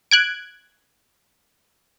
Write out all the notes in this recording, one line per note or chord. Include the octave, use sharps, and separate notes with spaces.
F#6 G#6 D7